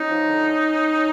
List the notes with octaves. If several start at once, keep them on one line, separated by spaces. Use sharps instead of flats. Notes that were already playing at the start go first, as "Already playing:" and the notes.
Already playing: C#4 D#4
F3
D3